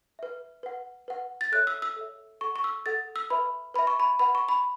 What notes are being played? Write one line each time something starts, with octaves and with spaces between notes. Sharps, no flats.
B4 E5
B4 F#5
B4 F#5
A6
A4 C#5 E5 F#6
E6
E6
A4 C#5 E5
A4 F#5 C#6
C#6
E6
A4 F#5 A6
E6
B4 E5 B5
B4 E5 B5
C#6
B5
B4 F#5 B5
C#6
B5